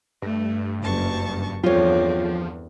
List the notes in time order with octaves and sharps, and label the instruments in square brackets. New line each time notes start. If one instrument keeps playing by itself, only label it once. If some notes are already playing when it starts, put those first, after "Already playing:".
[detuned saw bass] G2 [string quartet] A3
[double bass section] F#1 [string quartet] F#2 A5 C#6
[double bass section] E2 [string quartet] G2 D3 C4 [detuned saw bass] F3 [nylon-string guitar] F4 C#5